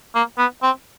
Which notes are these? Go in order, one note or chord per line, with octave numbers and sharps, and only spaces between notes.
A#3
B3
C4